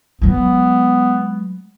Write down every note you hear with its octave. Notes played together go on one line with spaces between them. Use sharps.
F#3 G#3 B3